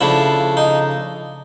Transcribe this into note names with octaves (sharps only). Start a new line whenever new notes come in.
C#3 F3 A3 D4 E4
D#4